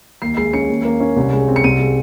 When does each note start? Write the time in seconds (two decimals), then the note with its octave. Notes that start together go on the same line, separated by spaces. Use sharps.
0.22 D#2 C7
0.37 G#3 C7
0.53 C#4 C#7
0.69 D#2
0.85 A#3
1.00 C#4
1.17 C2
1.33 G#3
1.48 C4
1.56 C#7
1.64 C2 D#7
1.80 G#3